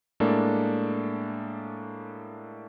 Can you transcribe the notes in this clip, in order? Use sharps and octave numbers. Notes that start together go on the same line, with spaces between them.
A2 G#3 A#3 D4 A4